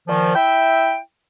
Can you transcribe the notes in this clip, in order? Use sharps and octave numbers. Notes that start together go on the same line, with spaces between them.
A#2 D#3 F3
E4 E5 G5